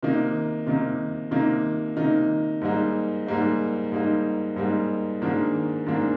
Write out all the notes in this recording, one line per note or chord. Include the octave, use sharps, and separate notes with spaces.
C3 D#3 A#3 D#4
C3 D#3 A#3 D#4
C3 D#3 A#3 D#4
C3 D#3 A#3 D#4
G#2 G3 A#3 D#4
G#2 G3 A#3 D#4
G#2 G3 A#3 D#4
G#2 G3 A#3 D#4
G#2 D#3 A#3 D4
G#2 D#3 A#3 D4